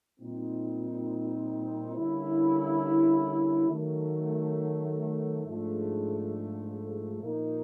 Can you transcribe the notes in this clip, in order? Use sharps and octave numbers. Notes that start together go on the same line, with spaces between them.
A#2 G3 C4 D#4
D3 G3 A#3 C#4 E4
D#3 F#3 A3
G#2 F3 A3 D4
A#2 F3 A#3 D#4